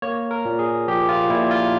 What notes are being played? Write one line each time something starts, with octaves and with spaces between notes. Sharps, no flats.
A#3 C#5
A#4
A#2
G#4
F3 G4
F4
A#2 E4
F4